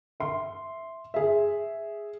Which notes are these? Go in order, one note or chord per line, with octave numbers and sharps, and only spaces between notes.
E5 C6
G#4 E5